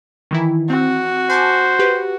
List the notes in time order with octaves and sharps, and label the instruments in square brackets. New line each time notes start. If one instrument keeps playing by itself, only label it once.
[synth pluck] D#3 E3 E4
[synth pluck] C4 [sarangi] F#4
[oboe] C5 [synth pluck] G#5 A5 D6
[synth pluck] G4 B4